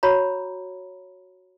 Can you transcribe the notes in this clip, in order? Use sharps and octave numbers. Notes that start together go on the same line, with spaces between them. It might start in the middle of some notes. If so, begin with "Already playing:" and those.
F#4 C#5 A#5 B5